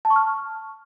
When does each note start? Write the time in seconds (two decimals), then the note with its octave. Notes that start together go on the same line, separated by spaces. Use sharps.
0.05 A5
0.10 C#6
0.16 F6